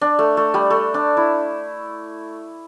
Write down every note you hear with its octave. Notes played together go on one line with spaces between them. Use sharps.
D4
A3
A3
G3
A3
D4
E4